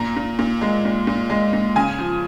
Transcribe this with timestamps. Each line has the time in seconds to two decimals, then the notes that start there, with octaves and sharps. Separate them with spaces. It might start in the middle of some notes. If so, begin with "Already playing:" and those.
Already playing: A#2 A#5
0.16 A#2
0.39 A#2
0.61 G#3
0.85 A#2
1.07 A#2
1.30 G#3
1.53 A#2
1.76 C#3 G#5
1.99 F3